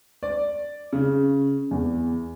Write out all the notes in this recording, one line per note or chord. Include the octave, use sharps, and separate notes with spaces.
D5
C#3
E2